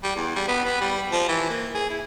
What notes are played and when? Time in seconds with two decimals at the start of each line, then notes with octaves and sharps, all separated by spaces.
0.03 G3
0.16 E2
0.36 G3
0.48 B3
0.65 B3
0.81 G3
1.12 F3
1.28 E3
1.50 A#3
1.74 G#4
1.90 E4